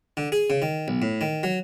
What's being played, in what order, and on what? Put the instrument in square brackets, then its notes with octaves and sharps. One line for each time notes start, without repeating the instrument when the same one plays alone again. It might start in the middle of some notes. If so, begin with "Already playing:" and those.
[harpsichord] D3
G#4
C#3
D#3
B1
A2
D#3
F#3